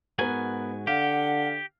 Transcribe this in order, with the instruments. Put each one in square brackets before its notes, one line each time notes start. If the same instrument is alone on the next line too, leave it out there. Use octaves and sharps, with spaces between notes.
[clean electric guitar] G#2 F#4 G#5 [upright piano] B3 A#4
[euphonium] D3 [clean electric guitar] G4 [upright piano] F5 [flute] F#5